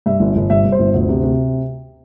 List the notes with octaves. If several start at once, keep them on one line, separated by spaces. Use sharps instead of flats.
G2 E5
G1
G1
G2 E5
G2
C5
G1
D2
C3
C3